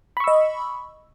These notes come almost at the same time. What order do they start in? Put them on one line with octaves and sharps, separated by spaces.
B5 C#6 E6 D#5